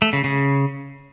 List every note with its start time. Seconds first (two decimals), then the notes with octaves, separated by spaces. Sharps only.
0.02 A3
0.13 C#3
0.24 C#3